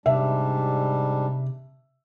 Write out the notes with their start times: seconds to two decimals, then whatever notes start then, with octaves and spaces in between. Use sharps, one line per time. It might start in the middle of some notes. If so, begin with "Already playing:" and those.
0.06 G#2 C3 G3 D4 E5